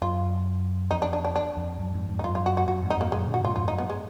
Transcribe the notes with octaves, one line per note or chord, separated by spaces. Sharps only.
F#2 F4
F2 D#4
D4
D4
D4
D4
F2
F#2
F2 G#2
F2 G#2
D#4
F#2 F4
F4
F#4
F#4
F#2 F#4
F2 G#2
D#4
F2 G#2 A#3
F#2 A#2 G#3
A#2 D3
F#4
G#2 B2 F4
F2 G#2 F4
D#4
F#2
B3
G#3